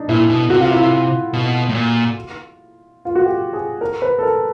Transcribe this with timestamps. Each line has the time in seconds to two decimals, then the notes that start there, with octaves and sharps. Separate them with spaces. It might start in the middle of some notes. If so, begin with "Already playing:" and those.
Already playing: D4 D#4
0.09 A#2 E4
0.30 B2
0.50 C3 F#4
0.61 F4
0.71 E4
0.81 F4
1.33 B2
1.69 A2
1.75 A#2
3.05 F4
3.15 F#4
3.26 G4
3.53 G#4
3.81 A#4
4.02 B4
4.19 A4
4.23 A#4